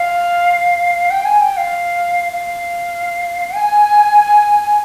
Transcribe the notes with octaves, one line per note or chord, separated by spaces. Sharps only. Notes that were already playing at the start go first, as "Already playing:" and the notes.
Already playing: F5
G5
G#5
G5
F5
F5
G#5